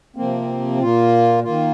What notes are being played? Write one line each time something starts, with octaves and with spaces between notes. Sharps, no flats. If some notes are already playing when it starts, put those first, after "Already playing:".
C3 F3 A#3 C4
A#2 A#3 F4
D#3 A#3 F4